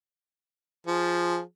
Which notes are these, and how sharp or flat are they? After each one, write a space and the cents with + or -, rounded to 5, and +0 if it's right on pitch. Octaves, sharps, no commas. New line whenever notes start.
F3 +0 G#4 +0